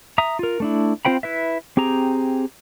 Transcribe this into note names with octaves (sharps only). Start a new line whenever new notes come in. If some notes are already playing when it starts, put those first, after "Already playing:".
E5 A#5 D#6
F4 A#4
A3 D4 E4
C4 F4 C5 G5 B5
E4 B4 E5
C4 G4 G#4 A#5